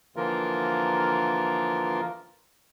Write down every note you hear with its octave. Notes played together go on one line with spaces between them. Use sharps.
D3 E3 F3 A#3 F4 A#4